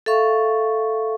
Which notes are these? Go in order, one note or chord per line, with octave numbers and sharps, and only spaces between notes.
A4 E5 F5 C#6